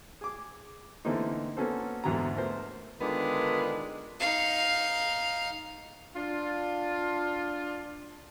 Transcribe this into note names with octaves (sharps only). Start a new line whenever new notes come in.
G#4 D6
D3 E3 A3 A#3 C4 D#4
A#3 B3 C#4 F#4 A4 C5
E2 G#2 D3 F#3 C#4 A#5
A3 B3 A#4 C5
D3 D#3 G#3 B3 D4 F4
D#4 F5
D4 F4